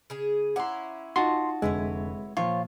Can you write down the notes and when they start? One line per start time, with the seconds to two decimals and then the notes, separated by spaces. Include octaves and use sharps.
0.10 C#3 G#4
0.56 C#4 E4 F#5 A#5 C6 D6
1.16 D#4 F4 F#4 A5 C6
1.62 F1 D3 G#3 E4 B4 C#5 G#6
2.37 A#2 F3 F4 C#5